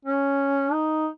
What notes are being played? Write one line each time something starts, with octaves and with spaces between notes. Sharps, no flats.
C#4
D#4